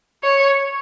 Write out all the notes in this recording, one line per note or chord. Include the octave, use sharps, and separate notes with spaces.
C#5